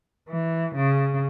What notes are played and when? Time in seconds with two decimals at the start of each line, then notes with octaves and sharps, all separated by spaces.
0.28 E3
0.76 C#3